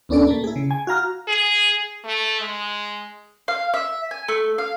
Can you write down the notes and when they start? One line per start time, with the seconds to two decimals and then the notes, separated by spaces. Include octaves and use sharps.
0.09 D#2 B3 C#4 D4 A4 D5
0.27 A#2 A3 A#3
0.44 E4 G#4
0.56 C#3
0.71 G#5
0.87 F#4 F5 A#5 F6
1.28 G#4
2.05 A3
2.41 G#3
3.48 F5
3.74 E5
4.11 G#5
4.28 A3
4.58 F5